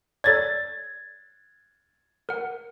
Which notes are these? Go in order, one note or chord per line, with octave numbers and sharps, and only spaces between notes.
A4 C#5 D5 G#6 A6
A#4 F#5